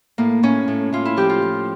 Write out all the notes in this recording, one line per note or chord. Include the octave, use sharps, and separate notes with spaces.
A2 A#3
A2 C#4
A2
A2 F4
E4
F3 G4
F4
F3